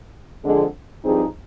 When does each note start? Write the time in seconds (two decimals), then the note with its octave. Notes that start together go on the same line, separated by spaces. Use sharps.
0.44 F2 D3 G#3
1.04 G2 F3 C4 D#4 G#4